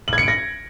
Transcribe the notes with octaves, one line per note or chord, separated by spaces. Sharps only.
F#7
G#6
C#7
D7
A#6